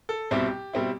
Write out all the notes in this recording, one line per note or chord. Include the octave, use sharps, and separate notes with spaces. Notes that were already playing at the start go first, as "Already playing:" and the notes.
A4
C2 B2 G3 C4 E4 G4
B2 G3 C4 E4